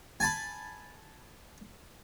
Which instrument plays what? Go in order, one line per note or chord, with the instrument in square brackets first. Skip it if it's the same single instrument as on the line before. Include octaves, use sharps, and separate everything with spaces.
[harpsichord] G#5 A5 B5